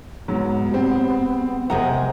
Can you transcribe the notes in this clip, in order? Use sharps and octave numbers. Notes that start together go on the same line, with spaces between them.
G#2 F#3 B3
G3 G#3 C4
C3 G#3 F#5 A#5